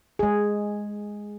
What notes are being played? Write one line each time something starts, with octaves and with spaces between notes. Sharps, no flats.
G#3 G#4